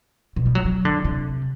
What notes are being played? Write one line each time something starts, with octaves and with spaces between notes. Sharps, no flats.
B2
G3
F#3
F#3
D3
C3